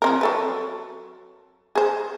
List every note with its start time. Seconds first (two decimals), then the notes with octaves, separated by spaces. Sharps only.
0.02 F3 C4 A#4
0.21 F#3 A4 B4
1.75 G#4 C5